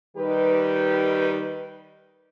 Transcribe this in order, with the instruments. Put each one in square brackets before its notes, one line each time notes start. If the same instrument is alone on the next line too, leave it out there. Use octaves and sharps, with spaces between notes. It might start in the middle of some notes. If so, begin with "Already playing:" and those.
[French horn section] D#3 G3 D#4 G4 B4